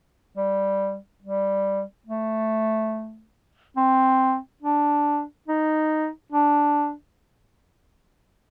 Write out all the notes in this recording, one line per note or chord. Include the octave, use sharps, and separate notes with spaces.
G3
G3
A3
C4
D4
D#4
D4